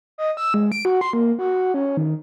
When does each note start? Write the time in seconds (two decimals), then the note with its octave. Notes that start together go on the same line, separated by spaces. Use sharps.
0.18 D#5
0.37 E6
0.54 G#3
0.72 D7
0.85 F#4
1.01 C6
1.13 A#3
1.39 F#4
1.74 C#4
1.97 D#3